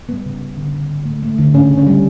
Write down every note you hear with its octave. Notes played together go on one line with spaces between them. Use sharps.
G3 B3
C#3
C#3
D3
D3
D3
A3
A3
D3
C#3 C#4
C#3
C#4
G3